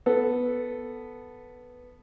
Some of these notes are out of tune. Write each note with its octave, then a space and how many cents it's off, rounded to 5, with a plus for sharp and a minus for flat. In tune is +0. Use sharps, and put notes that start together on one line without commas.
B3 +0 A4 +0